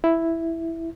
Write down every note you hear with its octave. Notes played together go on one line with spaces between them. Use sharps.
E4